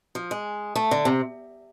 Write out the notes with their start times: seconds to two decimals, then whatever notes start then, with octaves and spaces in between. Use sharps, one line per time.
0.15 F3
0.31 G#3
0.76 A3
0.91 D3
1.05 C3